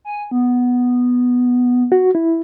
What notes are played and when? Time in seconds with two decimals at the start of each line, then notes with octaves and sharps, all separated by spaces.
0.05 G#5
0.31 B3
1.92 F#4
2.15 E4